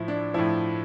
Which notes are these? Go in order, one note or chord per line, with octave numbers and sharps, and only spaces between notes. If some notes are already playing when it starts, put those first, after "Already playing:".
Already playing: A2 F3 E4
D4
A2 F3 E4